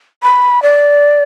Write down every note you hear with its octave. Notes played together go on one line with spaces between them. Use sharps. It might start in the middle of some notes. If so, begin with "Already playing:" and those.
B5
D5